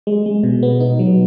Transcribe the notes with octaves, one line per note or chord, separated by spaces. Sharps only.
G#3
G#3
B2
B3
D#4
F#3